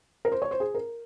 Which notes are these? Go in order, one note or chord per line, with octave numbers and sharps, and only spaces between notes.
A#4
C5
C#5
C5
G#4
A#4